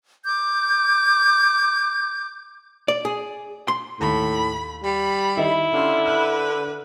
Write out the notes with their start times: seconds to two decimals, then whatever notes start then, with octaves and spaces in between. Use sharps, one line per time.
0.25 D6 G6
2.88 D5
3.05 G#4
3.68 C6
4.01 D#2 A2 B5
4.84 G3 B5
5.37 D#3 E4 G4 D#5
5.73 D3 C#4 F4
6.06 B4 F6